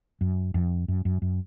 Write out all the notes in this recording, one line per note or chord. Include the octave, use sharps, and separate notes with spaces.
F#2
F2
F#2
F#2
F#2